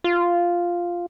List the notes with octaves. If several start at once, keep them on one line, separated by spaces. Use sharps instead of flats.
F4